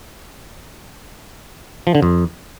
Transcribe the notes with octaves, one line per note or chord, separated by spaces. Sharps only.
F3
D3
F2